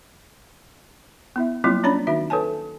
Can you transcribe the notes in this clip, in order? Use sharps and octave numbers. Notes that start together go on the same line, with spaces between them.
B3 E4 E5
F#3 G3 A#3 C4 E4 F4
C#4 D4 C#5 D5 A#5 B5
D#3 D#4 F#4 E5
A4 B4 C#5 G#5 A5